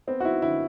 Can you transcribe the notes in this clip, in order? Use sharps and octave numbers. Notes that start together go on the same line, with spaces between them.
B3 C4
F#4
E4
D3 E4